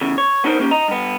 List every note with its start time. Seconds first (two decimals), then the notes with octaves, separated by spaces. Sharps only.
0.01 E2 C#3
0.18 C#5
0.44 B3 D4 D#4 F#4 A#4 C5
0.59 A#3 C#4 G4
0.71 D#5 A#5
0.88 G2 B3